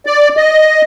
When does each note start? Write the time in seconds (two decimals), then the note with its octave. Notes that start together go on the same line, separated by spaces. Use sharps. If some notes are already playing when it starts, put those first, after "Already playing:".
0.06 D5
0.37 D#5